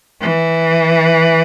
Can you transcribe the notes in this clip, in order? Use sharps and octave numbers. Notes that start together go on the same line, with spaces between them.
E3